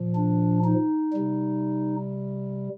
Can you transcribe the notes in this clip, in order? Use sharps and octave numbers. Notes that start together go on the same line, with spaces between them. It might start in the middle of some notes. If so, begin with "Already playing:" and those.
Already playing: A#2 F3
D4
D#4
C3 G3